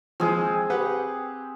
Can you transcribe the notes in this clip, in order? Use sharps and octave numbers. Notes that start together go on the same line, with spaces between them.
F3 G#3 C4 G#4
G4 B4 F#5